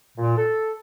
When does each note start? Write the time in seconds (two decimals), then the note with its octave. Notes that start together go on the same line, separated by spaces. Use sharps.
0.17 A#2
0.37 A4